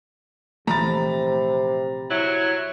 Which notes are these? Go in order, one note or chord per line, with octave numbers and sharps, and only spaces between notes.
A#1 C3 E3 A3 A#5 B5 A6
F#3 E4